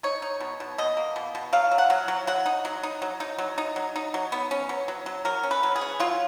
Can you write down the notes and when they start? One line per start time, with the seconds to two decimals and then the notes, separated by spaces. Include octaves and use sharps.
0.03 D#4 C#5
0.22 D#4
0.40 B2
0.60 B2
0.78 B2 D#5
0.97 A#3
1.16 B2
1.35 B2
1.53 F#3 F5
1.71 F#3
1.78 F#5
1.90 F#3
2.08 F#3
2.27 F#3 F#5
2.46 D#4
2.65 F#3
2.83 D#4
3.02 F#3
3.20 D#4
3.39 F#3
3.58 D#4
3.76 F#3
3.96 D#4
4.14 F#3
4.32 B3
4.51 C#4
4.69 F#3
4.88 F#3
5.06 F#3
5.25 F#3 A#4
5.43 C#4
5.51 B4
5.63 F#3
5.76 G#4
5.81 C#4
6.00 F#3 F4